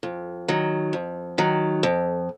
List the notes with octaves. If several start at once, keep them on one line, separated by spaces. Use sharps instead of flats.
F2
D#3 F#3
F2
D#3 F#3
F2